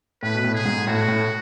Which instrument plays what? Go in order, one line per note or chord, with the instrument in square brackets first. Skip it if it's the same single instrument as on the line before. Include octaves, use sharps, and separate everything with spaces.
[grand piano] A2 [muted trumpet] B4
[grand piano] B2
A2
[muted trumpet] G#4
[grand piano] G#2
[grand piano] A2 [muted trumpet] F#4
[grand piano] A2